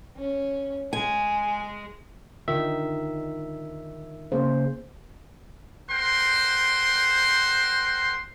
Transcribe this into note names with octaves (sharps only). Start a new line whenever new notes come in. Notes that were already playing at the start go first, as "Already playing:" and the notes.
C#4
G#3 G#5
D3 D#3 D#4 F4 E5
C#3 A#3 C5
A#4 C5 F#5 G5 C6